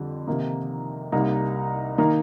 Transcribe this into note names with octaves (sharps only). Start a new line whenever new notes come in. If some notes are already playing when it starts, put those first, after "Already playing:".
Already playing: F2 D3 G3
C3 D#3 A#3 D#4
C2 C3 G3 A#3 D#4
D#3 A#3 D#4